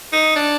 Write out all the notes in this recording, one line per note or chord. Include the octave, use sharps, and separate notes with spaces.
D#4
D4